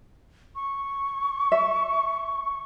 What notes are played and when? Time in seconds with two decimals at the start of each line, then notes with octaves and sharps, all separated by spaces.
0.55 C#6
1.52 E5